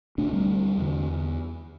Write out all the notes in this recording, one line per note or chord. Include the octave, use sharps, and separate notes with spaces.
D2 C3 A3 D4
G3 C4
E2 D3